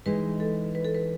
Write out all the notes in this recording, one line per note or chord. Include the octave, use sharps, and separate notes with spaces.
E3 G#3 D#4 B4
A4
B4
A4
B4